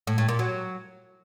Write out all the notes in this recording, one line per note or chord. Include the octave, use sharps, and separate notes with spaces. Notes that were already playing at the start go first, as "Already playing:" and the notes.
A2
A2
A#2
F#3